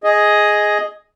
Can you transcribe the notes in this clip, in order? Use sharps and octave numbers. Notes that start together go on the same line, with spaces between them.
G#4 D#5